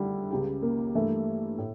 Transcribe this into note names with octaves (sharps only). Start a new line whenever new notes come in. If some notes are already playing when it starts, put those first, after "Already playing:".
Already playing: D3 G3 A3 E4
C#2 C#3 G3
A#3
G2 E3 G3 A3 A#3 E4
A2